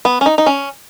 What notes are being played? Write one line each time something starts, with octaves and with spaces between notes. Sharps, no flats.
B3
C#4
D#4
D#4
C#4